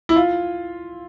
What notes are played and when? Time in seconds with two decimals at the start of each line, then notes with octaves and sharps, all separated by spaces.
0.09 E4
0.16 F4